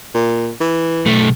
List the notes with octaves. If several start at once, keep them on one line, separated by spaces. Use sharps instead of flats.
A#2
E3
B1 A3